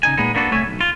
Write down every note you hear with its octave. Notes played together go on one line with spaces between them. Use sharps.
C#3 D#4 G#5
A#2 G#3 B3 D#4
A#3 B3 D4 F#4 A4
C2 A2 A3 C#5 E5 G#5
B1
F4